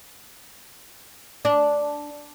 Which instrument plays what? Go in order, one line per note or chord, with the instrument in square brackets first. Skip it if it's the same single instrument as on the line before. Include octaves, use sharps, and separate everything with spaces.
[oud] D4